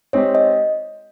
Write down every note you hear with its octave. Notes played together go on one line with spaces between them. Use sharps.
G#3 C4 D#4 G4 C#5
D#5